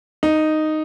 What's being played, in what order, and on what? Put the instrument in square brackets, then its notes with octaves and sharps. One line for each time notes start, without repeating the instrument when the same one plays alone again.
[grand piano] D#4